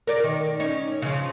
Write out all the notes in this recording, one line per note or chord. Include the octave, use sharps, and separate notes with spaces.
A#4 D5
D#3
C#4 D#4
C#3 F3